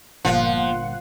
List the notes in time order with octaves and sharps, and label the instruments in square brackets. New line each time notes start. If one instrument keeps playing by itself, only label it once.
[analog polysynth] G1 A#2 F#5 [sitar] F3